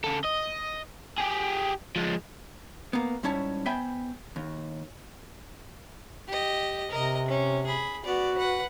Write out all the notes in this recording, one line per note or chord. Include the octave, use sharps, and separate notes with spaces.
C#3 A4
D#5
G4 G#4
F3 G#3
A#3 B3
G#2 G3 C#4 E4 C#5 A5
B3 C5 E5 G5 G#5 B5
D#2
G4 D#5
C3 A#4 D#5
C#4
G#4 B5
B3 F#4 D5
B4 F#5